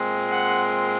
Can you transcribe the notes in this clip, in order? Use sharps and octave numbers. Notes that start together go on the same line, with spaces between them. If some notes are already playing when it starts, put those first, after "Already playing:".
Already playing: A#2 G#3 C4
F#5